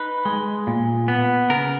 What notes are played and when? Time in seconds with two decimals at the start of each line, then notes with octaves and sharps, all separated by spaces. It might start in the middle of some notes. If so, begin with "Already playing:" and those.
Already playing: D#4 B4
0.25 G#3
0.67 A#2
1.08 B3
1.50 C#3 A#4